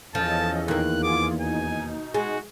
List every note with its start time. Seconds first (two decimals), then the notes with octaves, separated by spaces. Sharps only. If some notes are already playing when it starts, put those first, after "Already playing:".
0.15 E2 F3 C#4 A4 D#5 A5
0.68 D#2 A#3 F#6
1.03 B3 F4 G#4 D6
1.41 B2 D#4 G#5
2.14 G#3 F#4